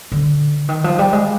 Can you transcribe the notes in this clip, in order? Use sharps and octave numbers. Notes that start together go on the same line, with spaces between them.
D3
D#3
F3
G3
G#3